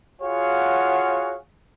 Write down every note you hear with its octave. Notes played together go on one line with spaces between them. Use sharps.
F4 F#4 G#4 C#5 F5 F#5